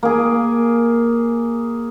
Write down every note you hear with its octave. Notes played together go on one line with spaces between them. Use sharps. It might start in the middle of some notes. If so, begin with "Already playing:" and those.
A#3 G#4